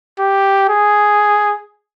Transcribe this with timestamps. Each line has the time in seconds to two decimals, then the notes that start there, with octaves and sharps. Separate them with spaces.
0.20 G4
0.69 G#4